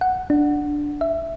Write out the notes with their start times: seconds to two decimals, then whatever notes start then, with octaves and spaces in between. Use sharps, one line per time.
0.01 F#5
0.30 D4
1.01 E5